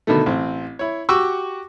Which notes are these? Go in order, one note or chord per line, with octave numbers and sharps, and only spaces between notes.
B2 D3 D#3 A3
A1 C4
E4 C#5
F#4 G4 C#6 D6 E6